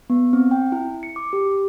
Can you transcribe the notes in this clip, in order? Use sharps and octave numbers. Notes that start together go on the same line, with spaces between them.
B3
C4
G5
E4
C#7
D6
G4